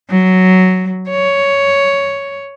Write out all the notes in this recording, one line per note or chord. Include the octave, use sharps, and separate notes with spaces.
F#3
C#5